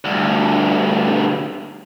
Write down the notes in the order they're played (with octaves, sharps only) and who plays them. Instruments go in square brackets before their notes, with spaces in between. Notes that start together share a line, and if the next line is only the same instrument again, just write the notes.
[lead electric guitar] D2 G2